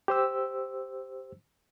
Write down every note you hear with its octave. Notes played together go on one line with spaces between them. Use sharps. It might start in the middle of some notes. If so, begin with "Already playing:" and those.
G4 C5 E6